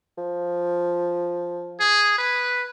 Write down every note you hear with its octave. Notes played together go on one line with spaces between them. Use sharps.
F3
G#4
B4